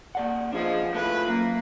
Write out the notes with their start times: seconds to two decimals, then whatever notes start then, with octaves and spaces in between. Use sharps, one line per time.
0.15 A#3 D5 F#5
0.53 F3 D4 G#4 D#5
0.95 A3 E4 F4 B4
1.28 F#2 A#3